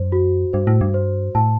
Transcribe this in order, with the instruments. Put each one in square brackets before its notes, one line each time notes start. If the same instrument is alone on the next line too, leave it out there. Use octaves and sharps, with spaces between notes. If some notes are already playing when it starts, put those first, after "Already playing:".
Already playing: [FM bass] F#2 [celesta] C5
[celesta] F#4
[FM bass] G2 [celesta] C5
[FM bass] A2
G2
[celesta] C5
[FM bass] A2 [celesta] A5